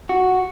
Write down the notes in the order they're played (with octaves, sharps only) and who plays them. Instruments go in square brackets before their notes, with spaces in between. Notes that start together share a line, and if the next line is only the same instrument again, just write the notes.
[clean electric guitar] F#4